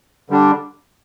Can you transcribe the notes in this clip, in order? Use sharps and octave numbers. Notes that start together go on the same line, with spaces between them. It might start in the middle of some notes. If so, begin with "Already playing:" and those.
D3 G3 D4